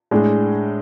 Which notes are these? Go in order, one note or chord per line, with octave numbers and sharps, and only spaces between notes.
A2 G#3 D4 G#4